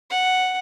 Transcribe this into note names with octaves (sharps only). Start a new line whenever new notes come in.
F#5